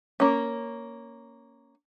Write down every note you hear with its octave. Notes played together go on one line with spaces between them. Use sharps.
A#3 C#4